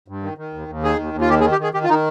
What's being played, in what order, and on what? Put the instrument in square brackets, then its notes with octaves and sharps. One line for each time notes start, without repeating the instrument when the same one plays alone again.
[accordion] G2
D#3
D#3
D#2
D#2
D#3 G#4
D#2
D#2
F4
D#3 G4
G#4
D#3
G4
D#3 G#4
D#3 G4
F4
D#3 D#4